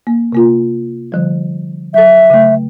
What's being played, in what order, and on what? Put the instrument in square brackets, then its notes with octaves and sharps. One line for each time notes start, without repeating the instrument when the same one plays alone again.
[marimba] A#3
C3 A#3 F4
D3 F3 G3
[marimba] F#3 A4 [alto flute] E5
[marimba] C#3 A3